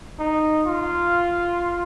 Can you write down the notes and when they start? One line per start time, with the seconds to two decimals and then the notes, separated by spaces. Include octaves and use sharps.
0.20 D#4
0.66 F4